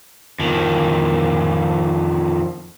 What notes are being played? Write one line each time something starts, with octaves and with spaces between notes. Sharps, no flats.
F2 D#3